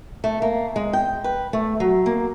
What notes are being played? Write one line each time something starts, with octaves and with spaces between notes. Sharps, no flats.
A3
A#3
G#3
G5
B4
A3
F#3
A#3